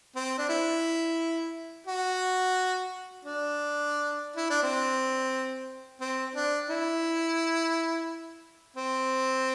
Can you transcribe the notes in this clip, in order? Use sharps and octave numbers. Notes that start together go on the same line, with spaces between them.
C4
D4
E4
F#4
D4
E4
D4
C4
C4
D4
E4
C4